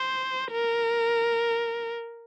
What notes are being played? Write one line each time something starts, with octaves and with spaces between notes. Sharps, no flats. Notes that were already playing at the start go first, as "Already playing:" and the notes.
Already playing: C5
A#4